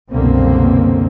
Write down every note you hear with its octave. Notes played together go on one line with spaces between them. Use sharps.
C2 F#2 B2 D3 A#3 C4